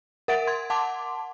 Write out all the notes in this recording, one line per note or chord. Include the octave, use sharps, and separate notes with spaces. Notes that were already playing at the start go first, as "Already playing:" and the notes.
A#4 E5 F#5 A6 D7
C6 G#6
F#5 A5 C6 D6